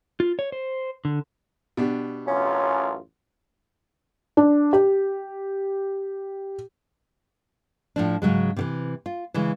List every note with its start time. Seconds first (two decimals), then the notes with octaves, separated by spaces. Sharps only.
0.20 F4
0.39 C#5
0.52 C5
1.05 D3
1.77 B2 D4 G4
2.27 A1 F#2 C#4 F4
4.37 D4
4.73 G4
7.96 A2 F3 D4
8.22 G#2 C#3 F#3 G#3
8.56 C3 D#3 E3
9.06 F4
9.34 C#3 E3 G#3